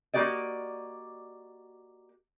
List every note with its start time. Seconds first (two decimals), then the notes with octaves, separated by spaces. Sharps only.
0.14 A#3 F#4 G4 D5 D#5